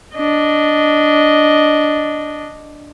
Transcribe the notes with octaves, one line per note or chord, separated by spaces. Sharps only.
D4 D#5